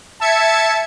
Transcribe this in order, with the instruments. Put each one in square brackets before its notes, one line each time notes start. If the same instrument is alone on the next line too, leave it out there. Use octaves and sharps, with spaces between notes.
[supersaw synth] E5 G#6 C#7 [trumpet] A5